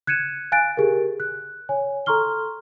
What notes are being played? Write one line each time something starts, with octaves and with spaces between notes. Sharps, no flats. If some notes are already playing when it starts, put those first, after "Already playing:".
F#6 G#6 C#7 D#7 E7
F5 G#5 F#6 A6 D7
G4 G#4 A#4
F#6
C#5 G#5
A4 A#5 C6 C#6 F6 G7